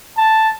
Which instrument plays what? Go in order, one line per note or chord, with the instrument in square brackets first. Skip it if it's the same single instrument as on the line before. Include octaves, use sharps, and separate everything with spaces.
[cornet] A5